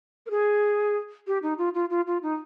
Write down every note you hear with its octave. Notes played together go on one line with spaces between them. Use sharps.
A#4
G#4
G4
D#4
F4
F4
F4
F4
D#4